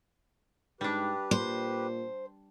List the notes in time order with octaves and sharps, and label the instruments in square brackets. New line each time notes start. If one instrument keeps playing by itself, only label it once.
[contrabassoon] G#2 [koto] G3 D4 [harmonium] G4 B4
[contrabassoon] A#2 [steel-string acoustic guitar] C5